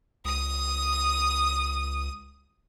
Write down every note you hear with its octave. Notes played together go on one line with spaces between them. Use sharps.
C#2 D#6 D#7